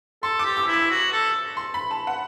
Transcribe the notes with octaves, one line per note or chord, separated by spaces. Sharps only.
A4 C6
D6
G4
E6
E4
D6
F#4
A4
C6
B5
A5
F#5